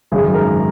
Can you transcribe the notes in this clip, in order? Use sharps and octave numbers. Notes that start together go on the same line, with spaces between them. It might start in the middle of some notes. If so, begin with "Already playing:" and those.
G#1 F#2 C#3 G#4
A#4